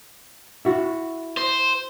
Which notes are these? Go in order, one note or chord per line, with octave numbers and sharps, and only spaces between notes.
E4 F#4
C5